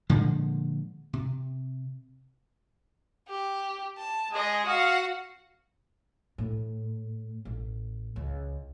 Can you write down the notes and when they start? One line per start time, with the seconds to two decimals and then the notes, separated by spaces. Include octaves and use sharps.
0.09 A#2 D3 F3 G#3
1.13 C3
3.29 G4
3.98 A5
4.32 G#3 G#4 D#5 D#6
4.66 F#4 F5 F#5
6.38 A2
7.45 A1
8.16 C#2